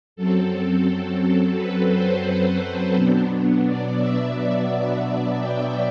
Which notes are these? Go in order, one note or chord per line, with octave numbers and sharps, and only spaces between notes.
F#2 F#3 C4 A4
B4
C5
B4
B2 F#3 B3 D4
D5
E5
E5
E5
G5